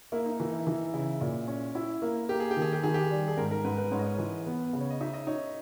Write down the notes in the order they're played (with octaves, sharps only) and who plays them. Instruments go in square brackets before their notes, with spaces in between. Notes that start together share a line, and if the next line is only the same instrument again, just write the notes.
[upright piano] A#3 [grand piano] E4
[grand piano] D#4
[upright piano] E3 [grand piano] D#4
[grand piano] E4
[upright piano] E3 [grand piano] D#4
[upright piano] C#3 [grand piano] E4
[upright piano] A#2
C#4
E4
A#3
[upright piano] A#3 [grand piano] G4
[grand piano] G#4
G4
[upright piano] D#3
[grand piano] G#4
G4
[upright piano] D#3 [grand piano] G#4
[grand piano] G4
[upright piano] G3
[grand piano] G#4
[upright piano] G#2 [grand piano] A#4
[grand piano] A#4
[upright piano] G#2 [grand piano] B4
[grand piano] B4
[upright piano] G#2 [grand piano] C#5
[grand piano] D#5
C#5
[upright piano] E3
B3
C#3
[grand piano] C#5
D#5
[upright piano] D#4 [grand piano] E5
[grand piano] D#5
[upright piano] D#4 [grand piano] C#5